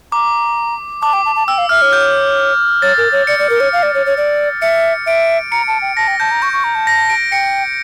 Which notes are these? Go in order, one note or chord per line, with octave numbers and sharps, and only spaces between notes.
A#5 D6
A5 D6
G5
A5
A5
G5 E6
F5
E5 F6
C#5
G6
C#5 A6
A#4
C#5
D5 C#7
D5
A#4
C#5
F5
D5
C#5
C#5
D5
E5 C#7
E5 D7
A#5 C#7
A5
G5
A5 A#6
G5
A5 G6
A#5
C#6 G6
C#6
A#5
A5
A#6
D7
G5 C#7